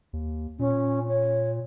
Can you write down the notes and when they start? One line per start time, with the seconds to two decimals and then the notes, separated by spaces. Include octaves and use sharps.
0.13 D#2
0.59 A#2 C#4
1.09 C#5